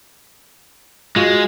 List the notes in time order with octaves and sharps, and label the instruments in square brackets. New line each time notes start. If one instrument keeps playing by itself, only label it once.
[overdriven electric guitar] G#3 [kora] F4 F#4